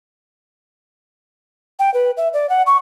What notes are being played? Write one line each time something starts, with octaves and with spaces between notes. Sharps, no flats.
G5
B4
E5
D5
F#5
C#6